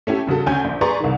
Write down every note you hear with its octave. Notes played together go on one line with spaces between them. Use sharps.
A3 C#4 E4 G4
G2 C#3 F#4 A4
D2 C#4 G#5 G6
A#1
G#4 B4 D5 A#5 C6 C#6
C2 D#3